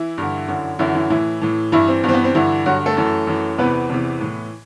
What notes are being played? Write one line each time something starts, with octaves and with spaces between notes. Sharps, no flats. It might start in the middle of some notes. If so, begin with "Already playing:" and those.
Already playing: E3 E4
G2 D3
F#2 D3
F#2 D3 E3 E4
E3 E4
A2 E3 E4
A2 E3
G2 E3 E4
C4
G2 E3 B3 C4
B3
C4
G2 D3 E3 E4
G2 D3 F#3 F#4
A3 A4
F#2 E3
F#2 E3
E2 C3 E3 B3 B4
E2 C3 E3
A2 E3